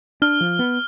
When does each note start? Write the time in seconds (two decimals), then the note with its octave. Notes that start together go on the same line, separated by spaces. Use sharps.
0.22 D4 F6
0.41 F3
0.59 B3